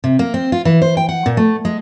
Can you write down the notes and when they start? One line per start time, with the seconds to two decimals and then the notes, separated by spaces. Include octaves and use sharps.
0.04 C3
0.19 A#3
0.34 C4
0.52 F4
0.65 E3
0.82 C5
0.97 G5
1.09 F#5
1.26 A#2
1.37 A3
1.65 G#3